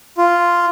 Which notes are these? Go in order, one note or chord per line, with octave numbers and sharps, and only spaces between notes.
F4